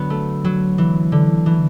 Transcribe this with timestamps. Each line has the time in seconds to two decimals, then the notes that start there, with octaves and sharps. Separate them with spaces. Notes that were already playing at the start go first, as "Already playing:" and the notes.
Already playing: D3 F#3 B3
0.10 A3
0.44 F#3
0.78 E3
1.12 D3
1.46 E3